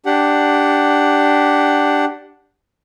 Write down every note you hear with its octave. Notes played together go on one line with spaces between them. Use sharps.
D4 G4 F#5